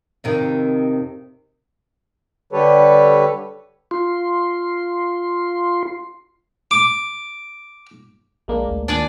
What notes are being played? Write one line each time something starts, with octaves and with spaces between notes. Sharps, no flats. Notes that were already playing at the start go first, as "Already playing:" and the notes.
F2 C3 D#3
D3 G3 G4 A4 B4 C#5
F4 C6
D6
A#1 G#3 A#3 D4
D2
D#2 A#2 D4 D5 G#5